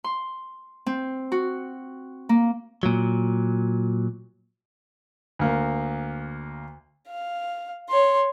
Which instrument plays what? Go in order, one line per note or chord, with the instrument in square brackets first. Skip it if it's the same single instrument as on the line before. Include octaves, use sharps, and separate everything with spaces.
[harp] C6
C4
F#4
A#3
[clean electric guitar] A#2 F#3
[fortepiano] D2 A#3
[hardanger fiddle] F5
C#5 C6